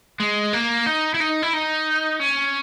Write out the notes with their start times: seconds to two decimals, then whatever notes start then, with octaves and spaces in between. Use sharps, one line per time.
0.20 G#3
0.53 A#3
0.86 D#4
1.14 E4
1.20 D#4
1.42 E4
1.53 D#4
2.20 C#4